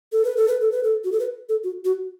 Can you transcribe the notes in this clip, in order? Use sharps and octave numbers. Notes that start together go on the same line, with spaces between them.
A4
B4
A4
B4
A4
B4
A4
F#4
A4
B4
A4
F#4
F#4